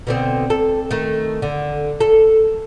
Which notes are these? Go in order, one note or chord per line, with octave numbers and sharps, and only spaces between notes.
B2 D3 C4
A4
D#3 A3
D3
A4